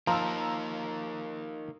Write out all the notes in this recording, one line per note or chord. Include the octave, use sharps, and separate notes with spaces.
F3 A#3 D#4 A#5 E6